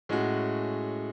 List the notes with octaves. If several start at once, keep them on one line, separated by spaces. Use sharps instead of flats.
A2 G#3 C#4 F#4